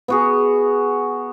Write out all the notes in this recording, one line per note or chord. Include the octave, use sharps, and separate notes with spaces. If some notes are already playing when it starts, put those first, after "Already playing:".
B3 F#4 G#4